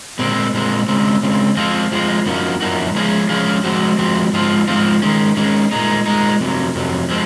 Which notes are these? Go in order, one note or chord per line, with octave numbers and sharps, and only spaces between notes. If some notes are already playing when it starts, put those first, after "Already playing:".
A#2 G#3 C4
A#2 G#3 C4
C#3 G#3 C4
C#3 G#3 C4
F3 G#3 C4 F4
F3 G#3 C4 F4
F#2 F3 A#3 D#4 F#4
F#2 F3 A#3 D#4 F#4
F3 G#3 C#4 F4 G#4
F3 G#3 C#4 F4 G#4
F3 G#3 C4 F#4
F3 G#3 C4 F#4
G#2 F3 G#3 C4 F4
G#2 F3 G#3 C4 F4
D#3 G#3 C#4
D#3 G#3 C#4
A#2 G#3 D#4
A#2 G#3 D#4
F2 C3 F#3
F2 C3 F#3
F3 G#3 C4